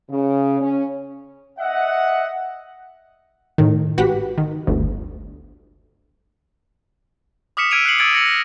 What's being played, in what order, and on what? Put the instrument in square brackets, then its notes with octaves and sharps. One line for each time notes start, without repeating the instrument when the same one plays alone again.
[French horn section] C#3
C#4
[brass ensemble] D#5 E5 F#5
[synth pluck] A2 D#3
G#1 F#4 G4 B4 F#5 B6
D#3
G1 D2
[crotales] D6 D#6 F6 B6 C#7 E7
E6 F6 G#6 D7 D#7 F7
F#6 C7 C#7 F#7
D#6 E6 G#6 A6 D7 F#7
E6 G#6 A#6 C#7 F#7
A#6